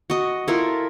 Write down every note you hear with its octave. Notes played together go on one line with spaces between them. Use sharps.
F#4 D#5
E4 F4 A4 A#4